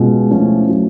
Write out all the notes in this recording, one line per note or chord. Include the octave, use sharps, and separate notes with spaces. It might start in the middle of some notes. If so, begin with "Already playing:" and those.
Already playing: B2 G#3 C#4 F4
F3 A3 C#4 E4
F#3 A3 C#4